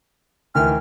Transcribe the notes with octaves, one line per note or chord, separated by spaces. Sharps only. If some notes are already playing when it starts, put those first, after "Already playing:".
D2 D#3 E3 F6